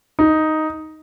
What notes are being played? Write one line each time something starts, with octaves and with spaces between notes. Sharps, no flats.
D#4